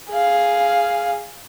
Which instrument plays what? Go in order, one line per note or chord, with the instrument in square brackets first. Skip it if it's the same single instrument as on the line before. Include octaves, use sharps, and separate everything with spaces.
[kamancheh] G#4 F5